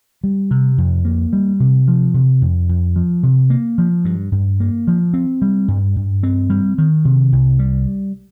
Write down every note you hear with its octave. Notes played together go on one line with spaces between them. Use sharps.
G3
C3
F2
A#3
G3
C3
F3
C3
F2
F2
F3
C3
A#3
F3
G2
G2
A#3
F3
C4
G3
G2
G2
C4
G3
D#3
C3
C2
G3